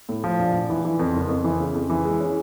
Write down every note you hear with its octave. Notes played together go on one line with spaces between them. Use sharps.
A2
F3
A#1
A#1
E3
E3
F2
F#1
F2
E3
C#3
F2
E3
G#3
C#4